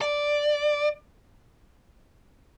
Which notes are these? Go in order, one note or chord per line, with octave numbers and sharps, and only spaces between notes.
D5